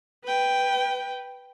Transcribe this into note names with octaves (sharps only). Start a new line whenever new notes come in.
B4 G5